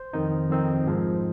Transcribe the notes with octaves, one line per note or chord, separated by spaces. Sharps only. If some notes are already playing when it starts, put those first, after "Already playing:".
Already playing: C5
F2 D#3 C4 D#4
F2 D#3 C4 D#4
G#2 F3 G#3